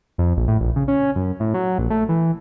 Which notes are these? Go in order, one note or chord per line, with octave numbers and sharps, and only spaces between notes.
F2
A#1
A2
A#1
C#3
C#4
F#2
A2
F#3
A#1
A3
E3